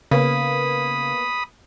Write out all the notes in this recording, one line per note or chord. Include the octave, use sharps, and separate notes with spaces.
C#3 A#3 B3 B5 D#6